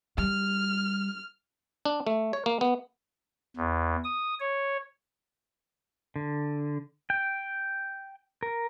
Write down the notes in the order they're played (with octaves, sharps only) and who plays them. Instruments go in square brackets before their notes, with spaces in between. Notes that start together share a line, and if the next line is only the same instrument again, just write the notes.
[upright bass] G3 [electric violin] F6
[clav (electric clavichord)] D4
A3
C#5
A#3
B3
[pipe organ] E2
D#6
C#5
[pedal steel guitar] D3
G5
A#4